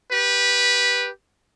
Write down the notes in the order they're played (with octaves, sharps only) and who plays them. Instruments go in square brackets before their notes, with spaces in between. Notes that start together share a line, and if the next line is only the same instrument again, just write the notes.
[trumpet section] G4 B4